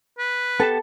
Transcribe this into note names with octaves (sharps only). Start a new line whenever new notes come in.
B4
B3 G4 A4 A5